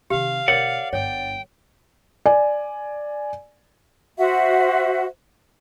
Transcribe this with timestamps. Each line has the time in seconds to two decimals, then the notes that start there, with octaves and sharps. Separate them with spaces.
0.10 C3 D#3 G4 F5
0.48 B2 D3 A#4 C#5 D5 F#5
0.93 G1 G2 C#5 G5
2.26 D5 G#5
4.18 F#4 C5 E5 F#5